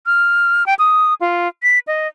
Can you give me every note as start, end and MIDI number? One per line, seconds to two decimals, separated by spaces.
0.06 0.66 89
0.66 0.74 79
0.79 1.14 87
1.21 1.48 65
1.63 1.79 95
1.87 2.07 75